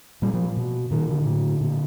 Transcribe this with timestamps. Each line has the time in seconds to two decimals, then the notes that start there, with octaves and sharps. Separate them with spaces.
0.22 A#2 G3
0.34 F3
0.57 B2
0.91 A#2 D#3
1.09 D3
1.25 A2
1.61 A#2